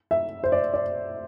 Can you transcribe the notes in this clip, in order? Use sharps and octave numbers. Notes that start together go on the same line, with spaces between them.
E5
C5
D5
D5